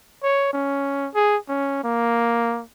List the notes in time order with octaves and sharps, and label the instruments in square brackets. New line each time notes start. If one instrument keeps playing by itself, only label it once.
[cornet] C#5
C#4
G#4
C#4
A#3